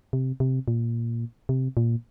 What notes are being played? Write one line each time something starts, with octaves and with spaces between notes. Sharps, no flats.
C3
C3
A#2
C3
A#2